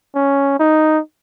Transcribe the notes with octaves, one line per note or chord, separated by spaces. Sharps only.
C#4
D#4